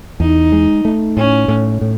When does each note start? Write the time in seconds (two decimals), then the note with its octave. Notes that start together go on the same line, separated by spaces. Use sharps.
0.20 E2 D#4
0.52 G#3
0.85 A3
1.17 A2 C#4
1.48 A2
1.81 A2